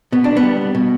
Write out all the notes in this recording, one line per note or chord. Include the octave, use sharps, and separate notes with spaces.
B2 B3
D4
B3
G3
B2